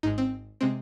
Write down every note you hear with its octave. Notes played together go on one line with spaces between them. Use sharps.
G#1 G#2 G#3 D#4
C4
C3 G#3 C4